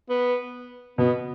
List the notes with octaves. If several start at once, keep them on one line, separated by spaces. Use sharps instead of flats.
B3
B2 B3